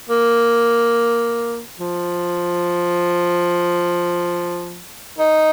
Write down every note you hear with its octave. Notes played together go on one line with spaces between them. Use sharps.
A#3
F3
D#4